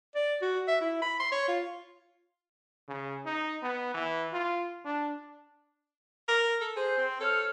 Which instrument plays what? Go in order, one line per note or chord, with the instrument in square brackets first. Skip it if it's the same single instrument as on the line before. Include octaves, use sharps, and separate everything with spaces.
[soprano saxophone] D5
F#4
E5
E4
B5
C6
C#5
F4
[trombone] C#3
D#4
B3
E3
F4
D4
[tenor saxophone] A#4
A4
[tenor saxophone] G#4 [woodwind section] C5
[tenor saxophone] C4
[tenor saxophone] A4 [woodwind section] C5 C#5 F6